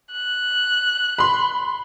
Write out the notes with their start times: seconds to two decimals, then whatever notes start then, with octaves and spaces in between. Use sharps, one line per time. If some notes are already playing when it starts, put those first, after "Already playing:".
0.13 F#6
1.18 B5 C6